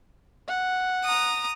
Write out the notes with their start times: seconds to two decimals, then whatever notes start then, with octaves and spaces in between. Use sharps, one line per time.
0.48 F#5
1.05 A#5 D#6